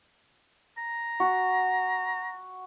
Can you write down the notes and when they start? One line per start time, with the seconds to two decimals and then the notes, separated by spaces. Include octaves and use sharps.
0.77 A#5
1.20 F#4